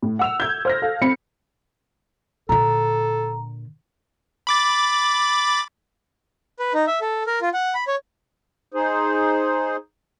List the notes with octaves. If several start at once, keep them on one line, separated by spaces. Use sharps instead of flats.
A2
F#5 E6 F7
G6 G#6
C5 F6 A#6
A4 F5
C4 B5 C#7
A#2 D3 A4 A#5
B5 D6 A6
B4
D#4
E5
A4
A#4
F4
F#5
B5
C#5
D#4 G#4 C5